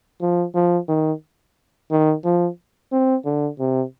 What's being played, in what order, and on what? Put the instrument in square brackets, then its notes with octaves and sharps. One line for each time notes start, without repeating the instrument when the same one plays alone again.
[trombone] F3
F3
D#3
D#3
F3
C4
D3
C3